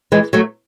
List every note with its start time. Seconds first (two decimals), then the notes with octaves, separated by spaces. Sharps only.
0.12 E3 G#3
0.33 F#3 A3